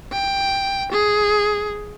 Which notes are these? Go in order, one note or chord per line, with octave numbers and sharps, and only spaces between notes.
G5
G#4